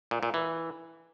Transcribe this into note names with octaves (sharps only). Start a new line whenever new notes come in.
A#2
A#2
E3